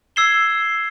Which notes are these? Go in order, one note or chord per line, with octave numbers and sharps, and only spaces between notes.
E6 G#6 C7 E7 G7